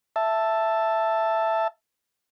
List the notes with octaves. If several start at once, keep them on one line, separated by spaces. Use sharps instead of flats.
E5 A5